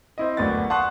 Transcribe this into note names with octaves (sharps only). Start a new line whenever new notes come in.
C4 E4 D#5
F#1 D2 B3 D4 F#4 A6
F#5 A5 C6 C#6 D#6 F#6